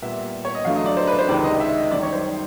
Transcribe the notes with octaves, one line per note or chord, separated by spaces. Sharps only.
A#2 G3 B3 E5
C#5
D#5
F#2 D3 F#3 A3 F5
D#5
D5
C5
B4
C5
C#2 C3 D#3 D5
D#5
E5
D#5
F#2 D#3 G3 D5
C#5
C5